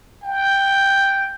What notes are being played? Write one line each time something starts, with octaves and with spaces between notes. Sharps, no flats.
G5